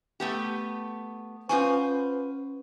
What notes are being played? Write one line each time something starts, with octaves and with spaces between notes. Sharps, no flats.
A3 B3 G4
C#4 F4 B4 C5 G#5 C#6